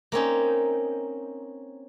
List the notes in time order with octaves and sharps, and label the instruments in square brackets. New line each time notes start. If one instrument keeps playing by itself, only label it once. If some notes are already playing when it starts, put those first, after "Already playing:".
[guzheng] A#3 C4 C#4 D#4